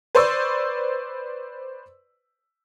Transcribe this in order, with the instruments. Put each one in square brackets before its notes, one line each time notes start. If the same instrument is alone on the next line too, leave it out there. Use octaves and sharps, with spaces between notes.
[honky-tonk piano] B4 C5 D5 C#6 E6